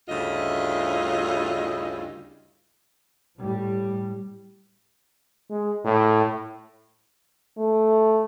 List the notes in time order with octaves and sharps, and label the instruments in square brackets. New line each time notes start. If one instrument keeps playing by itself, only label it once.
[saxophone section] D2 G2 C#3 E4 F4 D#5
[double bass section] A2 G3
[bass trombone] G#3
A2
[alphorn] A3